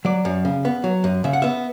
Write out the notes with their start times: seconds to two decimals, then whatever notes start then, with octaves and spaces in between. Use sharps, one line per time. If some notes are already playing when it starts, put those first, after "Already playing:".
0.05 F#3 D5
0.25 F#2
0.45 C#3
0.65 B3
0.84 F#3
1.04 F#2
1.24 C#3 E5
1.33 F#5
1.42 B3 E5